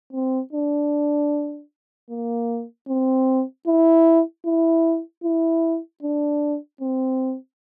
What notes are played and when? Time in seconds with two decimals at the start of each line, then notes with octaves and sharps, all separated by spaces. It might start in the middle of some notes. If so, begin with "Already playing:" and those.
0.13 C4
0.53 D4
2.10 A#3
2.89 C4
3.67 E4
4.46 E4
5.24 E4
6.03 D4
6.81 C4